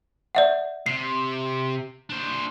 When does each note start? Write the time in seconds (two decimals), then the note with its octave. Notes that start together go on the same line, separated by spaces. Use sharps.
0.35 D5 E5 F#5
0.86 C3 C7
2.10 D4 C5